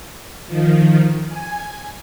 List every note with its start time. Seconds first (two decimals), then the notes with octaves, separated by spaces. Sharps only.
0.47 D#3 F3
1.29 G#5